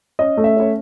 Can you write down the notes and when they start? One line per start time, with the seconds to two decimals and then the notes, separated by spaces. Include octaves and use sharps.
0.19 C#4 D#5
0.37 A3
0.44 E5
0.57 C#4 C#5